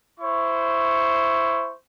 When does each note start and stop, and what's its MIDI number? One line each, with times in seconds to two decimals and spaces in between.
0.20 1.73 64
0.20 1.73 72
0.20 1.73 85